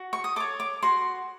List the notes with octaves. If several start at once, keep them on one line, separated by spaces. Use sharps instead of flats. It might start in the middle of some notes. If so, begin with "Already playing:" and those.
Already playing: F#4
C#6
D#6
A4 C#5 D6
D6
F#4 C6